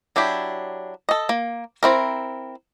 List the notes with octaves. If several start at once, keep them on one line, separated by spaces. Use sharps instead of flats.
F#3 D4 E4 G4
A4 D#5
A#3
C4 E4 A#4